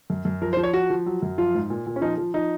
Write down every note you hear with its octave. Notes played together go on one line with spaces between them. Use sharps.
F#2
F#2
F3 A#4
C5
F3
C#5
F3 F#4
F3
F#3
F#2
F3 F4
G#2
A#2
A#2
C#4
F3 D#4
F3
F3 D#4